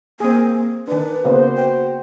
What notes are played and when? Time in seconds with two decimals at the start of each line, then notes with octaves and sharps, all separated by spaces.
0.20 A#3 C4 G#4
0.88 D#3 D4 B4
1.25 C#3 A#3 B3 F#4 C5
1.56 G5